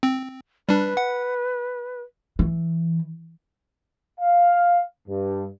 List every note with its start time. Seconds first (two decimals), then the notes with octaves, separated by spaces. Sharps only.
0.03 C4
0.69 G3 D4 B4
0.97 F#5
2.39 E3
4.20 F5
5.09 G2